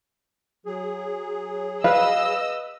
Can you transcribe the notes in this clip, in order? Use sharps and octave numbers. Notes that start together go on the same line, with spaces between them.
F#3 G#4
B4 D#5 F5 E6